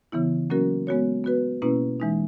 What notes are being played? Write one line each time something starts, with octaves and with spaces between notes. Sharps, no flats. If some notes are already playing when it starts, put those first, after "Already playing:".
C#3 E3 B3 E4
F#3 A#3 C#4 F#4 A#4
G#3 B3 F#4 C#5
B3 F#4 B4
B2 A#3 C#4 E4 B4
E3 G#3 D#4